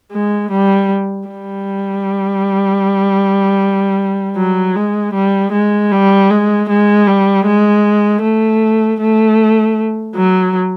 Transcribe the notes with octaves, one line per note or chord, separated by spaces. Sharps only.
G#3
G3
G3
F#3
G#3
G3
G#3
G3
G#3
G#3
G3
G#3
A3
A3
F#3